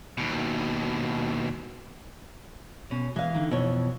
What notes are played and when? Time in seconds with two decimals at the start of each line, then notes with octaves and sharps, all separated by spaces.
0.18 D#2 B2
2.91 B2 C#4
3.16 E3 G#3 F5
3.35 D3 D#3
3.51 F2 B2 E3 C#5